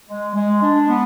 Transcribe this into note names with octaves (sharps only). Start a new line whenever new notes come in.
G#3
G#3
D4
B3